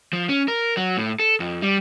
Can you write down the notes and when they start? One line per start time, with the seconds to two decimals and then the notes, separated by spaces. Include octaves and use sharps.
0.13 F3
0.29 C#4
0.48 A#4
0.77 F#3
0.97 A2
1.19 A4
1.40 F2
1.62 G3